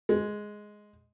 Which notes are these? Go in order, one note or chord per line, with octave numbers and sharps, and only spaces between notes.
G#3